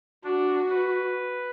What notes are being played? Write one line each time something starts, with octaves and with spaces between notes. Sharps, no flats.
D4 F#4
B4